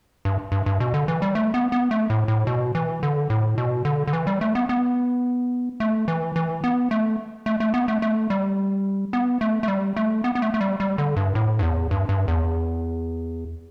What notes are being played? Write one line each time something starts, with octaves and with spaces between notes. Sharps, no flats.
G2
G2
G2
B2
D3
E3
G3
A3
B3
B3
A3
A2
A2
B2
E3
D3
A2
B2
D3
D3
E3
G3
A3
B3
B3
A3
E3
E3
B3
A3
A3
A3
B3
A3
A3
G3
B3
A3
A3
G3
A3
B3
B3
A3
A3
G3
G3
D3
G2
A2
G2
E2
G2
G2
E2